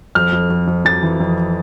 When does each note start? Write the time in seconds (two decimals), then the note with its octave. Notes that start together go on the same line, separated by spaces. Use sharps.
0.15 F2 F6
0.33 F2
0.50 F2
0.67 F2
0.85 F2 A6
1.03 E3
1.20 F2